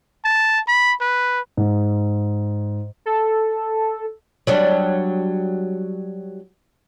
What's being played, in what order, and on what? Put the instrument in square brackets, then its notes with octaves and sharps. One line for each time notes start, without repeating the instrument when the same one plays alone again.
[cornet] A5
B5
B4
[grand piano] G#2
[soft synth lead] A4
[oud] F#3 G3 D4